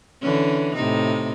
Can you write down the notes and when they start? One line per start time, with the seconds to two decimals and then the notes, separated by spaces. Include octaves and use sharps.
0.22 D3 E3 C#4
0.75 A2 C3 D#4